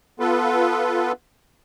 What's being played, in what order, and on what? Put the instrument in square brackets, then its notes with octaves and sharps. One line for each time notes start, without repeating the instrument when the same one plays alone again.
[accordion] B3 F4 A4 B4